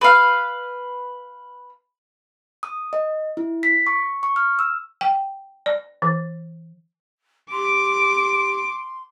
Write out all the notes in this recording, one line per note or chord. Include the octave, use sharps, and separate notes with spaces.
B4 F5
D#6
D#5
E4
B6
C#6
C#6
F6
E6
G5
D5
E3
G4 C6 D6 D7